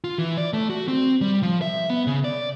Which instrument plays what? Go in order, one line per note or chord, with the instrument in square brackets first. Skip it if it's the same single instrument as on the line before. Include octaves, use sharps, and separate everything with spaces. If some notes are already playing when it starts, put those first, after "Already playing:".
[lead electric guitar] F4
E3
D5
A3
F#4
C4
G3
F3
E5
B3
C#3
D5